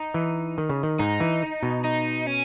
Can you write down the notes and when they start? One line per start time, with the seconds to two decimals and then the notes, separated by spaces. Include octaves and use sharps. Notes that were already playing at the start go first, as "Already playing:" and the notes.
Already playing: D#4
0.14 E3
0.58 D#3
0.70 C#3
0.83 D#3
0.99 G#2 D#4
1.20 E3
1.63 B2
1.85 D#4
2.27 C#4